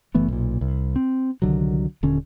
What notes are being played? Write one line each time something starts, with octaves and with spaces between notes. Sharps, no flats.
F#1 E3 A3 B3
B1 A#2
C2
C4
C2 D3 D#3 F#3
D#1 D3 C#4